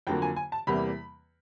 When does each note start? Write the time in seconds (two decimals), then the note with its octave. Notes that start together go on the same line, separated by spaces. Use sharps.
0.07 F2 D3 F#3 A#3 G5
0.22 G#5
0.36 G#5
0.52 A5
0.67 E2 C3 E3 G3 A#3 B5